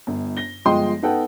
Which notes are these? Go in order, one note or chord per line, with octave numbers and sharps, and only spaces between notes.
G1
A#6 G7
G1 F3 G#3 D#5 G5 C6
B3 D#4 A4 F#5 G5